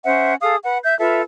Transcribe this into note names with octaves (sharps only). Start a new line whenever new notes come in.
C#4 C5 E5 F#5
G#4 A4 F5 D#6
B4 F#5
E5 G6
F4 A4 B4 E5